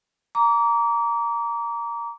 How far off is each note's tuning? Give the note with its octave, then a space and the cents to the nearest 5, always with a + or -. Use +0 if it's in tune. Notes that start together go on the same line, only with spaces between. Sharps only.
A#5 +0 D6 -30